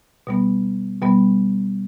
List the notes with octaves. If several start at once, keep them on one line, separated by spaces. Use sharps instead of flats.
B2 G3 B3
B2 G3 B3